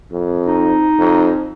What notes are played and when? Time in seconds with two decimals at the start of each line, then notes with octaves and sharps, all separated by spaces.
0.12 F2
0.46 D#4
0.98 F2